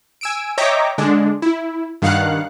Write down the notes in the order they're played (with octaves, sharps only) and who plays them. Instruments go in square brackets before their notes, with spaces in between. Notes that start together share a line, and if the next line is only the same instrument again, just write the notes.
[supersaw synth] G#5 E6 D7
C#5 D#5 E5 G5 A#5 D6
D3 G#3 D4
E4
G2 D#3 F5 F#5 F#6